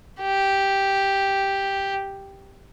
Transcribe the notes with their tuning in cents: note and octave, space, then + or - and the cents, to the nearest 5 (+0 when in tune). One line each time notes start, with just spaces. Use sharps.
G4 +0